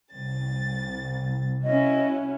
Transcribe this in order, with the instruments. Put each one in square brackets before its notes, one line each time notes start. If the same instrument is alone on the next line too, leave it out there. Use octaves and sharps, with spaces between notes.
[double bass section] C2 [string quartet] A6
[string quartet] C#4 E4 F#4 [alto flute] D#5